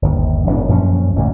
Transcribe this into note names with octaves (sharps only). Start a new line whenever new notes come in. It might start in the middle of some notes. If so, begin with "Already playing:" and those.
G1 D#2
E1 F#2 A2 D4
F#2 A#2 F3 C#4
G#1 D2 A#2